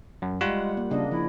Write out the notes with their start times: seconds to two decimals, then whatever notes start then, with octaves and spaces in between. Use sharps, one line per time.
0.22 F#2
0.41 G3 G#3 F4 F#5
0.77 A#3
0.91 C#3 A#3 D4 D#5
1.11 F3 E4